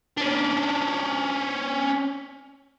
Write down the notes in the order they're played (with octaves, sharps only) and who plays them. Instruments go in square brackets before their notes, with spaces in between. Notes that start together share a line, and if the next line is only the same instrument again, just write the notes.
[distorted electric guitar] C#4 D4